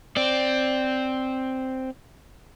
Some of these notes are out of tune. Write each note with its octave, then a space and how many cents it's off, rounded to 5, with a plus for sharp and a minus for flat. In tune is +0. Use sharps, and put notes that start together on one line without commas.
C4 +0 D5 +0